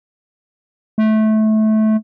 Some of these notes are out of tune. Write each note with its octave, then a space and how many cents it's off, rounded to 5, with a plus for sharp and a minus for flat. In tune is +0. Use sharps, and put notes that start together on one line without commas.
A3 -20